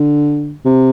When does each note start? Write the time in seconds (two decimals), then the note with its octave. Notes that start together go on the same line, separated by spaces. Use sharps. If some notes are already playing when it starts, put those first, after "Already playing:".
Already playing: D3
0.66 C3